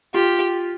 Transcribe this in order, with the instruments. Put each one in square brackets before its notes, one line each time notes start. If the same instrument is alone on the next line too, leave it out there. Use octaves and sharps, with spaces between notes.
[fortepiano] F4 [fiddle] G4